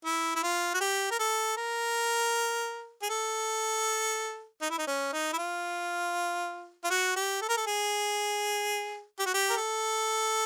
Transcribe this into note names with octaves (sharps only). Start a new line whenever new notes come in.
E4
E4
F4
F#4
G4
A#4
A4
A#4
G#4
A4
D#4
E4
D#4
C#4
D#4
E4
F4
F4
F#4
G4
A4
A#4
A4
G#4
G4
F#4
G4
A#4
A4